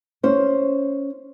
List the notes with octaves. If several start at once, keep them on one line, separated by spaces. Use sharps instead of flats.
C#4 C5